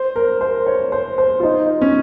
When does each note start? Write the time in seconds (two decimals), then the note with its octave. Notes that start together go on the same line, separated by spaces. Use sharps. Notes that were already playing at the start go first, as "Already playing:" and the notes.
Already playing: C5
0.16 A#4
0.41 C5
0.66 C#5
0.92 C5
1.18 C5
1.40 F4
1.43 D#4
1.81 C#4